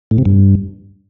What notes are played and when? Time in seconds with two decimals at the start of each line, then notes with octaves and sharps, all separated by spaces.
0.11 A2
0.18 C3
0.25 G2